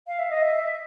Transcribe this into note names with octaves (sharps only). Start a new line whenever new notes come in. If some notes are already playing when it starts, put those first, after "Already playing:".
F5
E5
D#5
E5